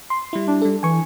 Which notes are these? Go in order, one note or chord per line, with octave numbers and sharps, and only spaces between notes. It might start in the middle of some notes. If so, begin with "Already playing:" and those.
C6
G3 E4
D4
G3 A4
E3 G#5 C#6